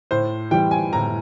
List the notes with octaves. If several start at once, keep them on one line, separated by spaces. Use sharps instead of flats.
A2 C5
E3 G3 G5
G#5
A2 A#5